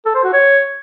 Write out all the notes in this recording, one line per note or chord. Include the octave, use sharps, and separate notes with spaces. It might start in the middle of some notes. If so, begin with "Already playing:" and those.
A4
C5
F#4
C#5